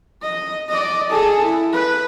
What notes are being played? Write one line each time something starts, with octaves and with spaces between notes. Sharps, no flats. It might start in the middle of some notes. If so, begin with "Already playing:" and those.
D#5
D5 D#5
G#4 A4
E4
B4